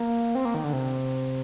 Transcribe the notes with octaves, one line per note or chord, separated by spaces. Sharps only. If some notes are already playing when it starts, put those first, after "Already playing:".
Already playing: A#3
C4
A#3
D#3
D3
C3